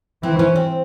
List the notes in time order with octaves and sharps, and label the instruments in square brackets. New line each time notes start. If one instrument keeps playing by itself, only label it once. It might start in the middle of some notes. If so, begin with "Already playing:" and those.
[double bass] E3 [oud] C4
[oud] C#4
C4